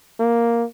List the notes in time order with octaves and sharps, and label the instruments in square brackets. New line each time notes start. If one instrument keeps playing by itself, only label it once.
[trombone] A#3